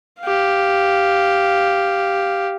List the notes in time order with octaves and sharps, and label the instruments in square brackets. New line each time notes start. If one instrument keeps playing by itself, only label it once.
[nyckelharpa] G4 F5